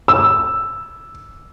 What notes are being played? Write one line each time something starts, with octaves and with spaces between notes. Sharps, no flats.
E6